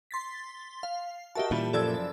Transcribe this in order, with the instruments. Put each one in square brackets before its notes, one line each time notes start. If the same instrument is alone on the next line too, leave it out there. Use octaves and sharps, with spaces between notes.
[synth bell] C6 A6 B6
F5
[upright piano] F#4 A#4 D#5 [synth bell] G4 E5 A5
[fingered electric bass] A#2 [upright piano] E3 G3
[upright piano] F#1 F3 G#6 [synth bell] A4 D5 E6